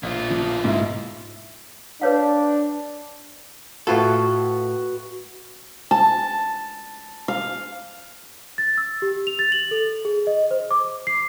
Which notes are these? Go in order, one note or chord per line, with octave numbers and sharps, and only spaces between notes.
A#1 B2 F4
F3
G#2 E4
D4 B4 C#5 F5
A2 F4 F#4 A4 B4
A5
F5
A6
E6
G4
F7
A6
F#7
A4
G#4
D#5
C5
D6
C7